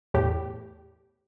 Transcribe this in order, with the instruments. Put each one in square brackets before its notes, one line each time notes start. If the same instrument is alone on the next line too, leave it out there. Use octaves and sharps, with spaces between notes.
[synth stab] E2 A2 G4